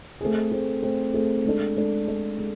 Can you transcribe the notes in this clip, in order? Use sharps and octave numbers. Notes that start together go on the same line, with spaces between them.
A3 C4 G#4
A3 C4 G#4
A3 C4 G#4
A3 C4 G#4
G#3 D4 A4
G#3 D4 A4
G#3 D4 A4
G#3